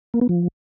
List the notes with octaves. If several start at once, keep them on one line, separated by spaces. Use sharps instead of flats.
A#3
B3
F3